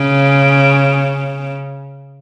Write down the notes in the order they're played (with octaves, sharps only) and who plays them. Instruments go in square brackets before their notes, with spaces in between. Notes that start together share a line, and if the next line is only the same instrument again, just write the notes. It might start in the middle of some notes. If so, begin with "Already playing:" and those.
Already playing: [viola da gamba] C#3